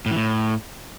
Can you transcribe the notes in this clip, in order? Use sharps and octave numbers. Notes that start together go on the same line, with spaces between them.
A2
E3
A2